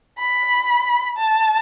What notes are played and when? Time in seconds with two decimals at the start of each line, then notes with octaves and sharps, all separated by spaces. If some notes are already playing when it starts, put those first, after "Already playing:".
0.18 B5
1.17 A5